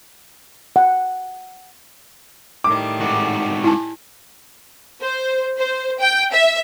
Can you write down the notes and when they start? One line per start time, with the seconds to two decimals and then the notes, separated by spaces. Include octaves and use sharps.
0.76 F#5
2.64 A2 D#3 G3 D6
3.01 G#2 F#4
3.64 E4 G#5 A5
5.02 C5
5.57 C5
5.99 G5
6.33 E5